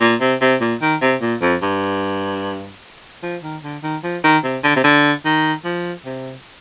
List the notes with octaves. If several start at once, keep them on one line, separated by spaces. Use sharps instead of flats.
A#2
C3
C3
A#2
D#3
C3
A#2
F2
G2
F3
D#3
D3
D#3
F3
D#3
C3
D3
C3
D3
D#3
F3
C3